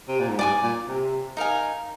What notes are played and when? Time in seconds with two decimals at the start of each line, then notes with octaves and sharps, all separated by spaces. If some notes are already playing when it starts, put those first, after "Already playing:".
0.08 C3
0.19 A#2
0.29 G#2
0.39 G2 D5 G#5 D6
0.63 A#2
0.88 C3
1.37 D#4 A#4 F5 G#5